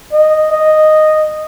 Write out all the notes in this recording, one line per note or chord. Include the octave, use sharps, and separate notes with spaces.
D#5
D#5